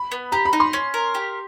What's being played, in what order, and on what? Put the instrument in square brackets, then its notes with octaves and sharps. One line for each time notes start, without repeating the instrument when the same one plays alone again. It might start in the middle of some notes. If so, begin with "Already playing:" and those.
Already playing: [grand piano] B5
[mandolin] B3
[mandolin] G4 [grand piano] A#5
[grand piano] B5
[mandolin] D#4
[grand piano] C6
[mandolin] C#4
A#4
G4